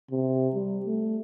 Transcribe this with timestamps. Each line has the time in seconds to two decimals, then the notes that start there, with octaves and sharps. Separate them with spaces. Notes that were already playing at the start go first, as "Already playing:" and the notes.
0.11 C3
0.54 G3
0.85 A3